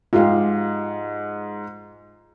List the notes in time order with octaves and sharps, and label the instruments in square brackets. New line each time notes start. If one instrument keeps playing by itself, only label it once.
[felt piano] G#2 G#3 [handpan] F4 G4 F5